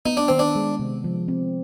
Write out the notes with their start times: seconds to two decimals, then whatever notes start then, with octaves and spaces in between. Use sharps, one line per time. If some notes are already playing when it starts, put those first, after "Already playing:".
0.06 B3 D#4
0.17 D4
0.28 D#3 C4
0.39 D4
0.56 G#3
0.79 C3
1.04 F3
1.28 C4